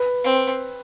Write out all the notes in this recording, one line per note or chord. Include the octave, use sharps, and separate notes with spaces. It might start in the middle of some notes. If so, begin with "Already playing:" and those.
Already playing: B4
C4